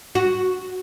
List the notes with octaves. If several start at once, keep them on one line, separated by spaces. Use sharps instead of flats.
F#4